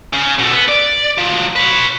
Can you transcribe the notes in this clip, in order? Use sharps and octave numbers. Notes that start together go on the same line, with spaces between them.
C#3
B2 A3
B3
D5
F3 F#3
B4 C#5